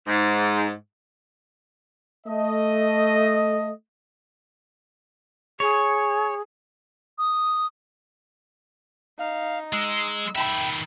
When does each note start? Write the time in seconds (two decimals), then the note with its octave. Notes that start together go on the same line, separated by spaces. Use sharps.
0.07 G#2
2.27 A3 D#5
5.60 G#4 C#5
7.18 D#6
9.19 D#4 F5
9.73 G#3 E6
10.35 D#3 E5 G5 B5